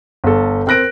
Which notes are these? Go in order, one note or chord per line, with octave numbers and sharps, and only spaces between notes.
G1 A4
C4 A#4 F#6 A#6 D7